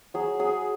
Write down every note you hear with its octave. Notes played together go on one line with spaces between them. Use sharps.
F#3 G#4
F#3 G#4